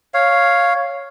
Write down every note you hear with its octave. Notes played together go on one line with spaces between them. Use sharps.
C#5 F5